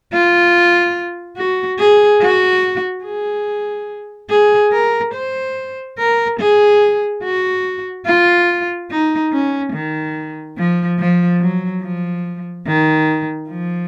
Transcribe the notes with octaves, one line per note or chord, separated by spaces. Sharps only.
F4
F#4
G#4
F#4
G#4
G#4
A#4
C5
A#4
G#4
F#4
F4
D#4
C#4
D#3
F3
F3
F#3
F3
D#3
F3